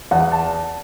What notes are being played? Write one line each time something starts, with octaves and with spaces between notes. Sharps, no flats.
E2 F#5
A5